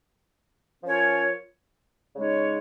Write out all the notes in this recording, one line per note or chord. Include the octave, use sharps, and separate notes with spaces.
F3 C#4 F4 A#4 C#5
C#3 G#3 D#4 C#5